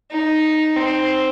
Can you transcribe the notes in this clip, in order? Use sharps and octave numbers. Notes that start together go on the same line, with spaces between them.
D#4
C4